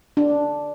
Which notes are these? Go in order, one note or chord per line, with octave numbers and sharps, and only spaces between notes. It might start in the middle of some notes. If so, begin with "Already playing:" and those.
D4